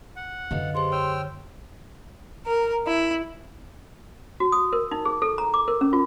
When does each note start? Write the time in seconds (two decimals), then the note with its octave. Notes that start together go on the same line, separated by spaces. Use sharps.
0.16 F#5
0.51 F#2 D3 B4 D#5 F5
0.75 G4 G#4 C5 C6
0.92 C#5 G5 E6 F6
2.46 A#4
2.86 E4
4.40 F#4
4.52 D#6
4.73 A#4
4.91 D#4
5.05 G#4
5.22 A4
5.38 A#5
5.54 D6
5.68 A#4
5.81 C#4
5.93 F4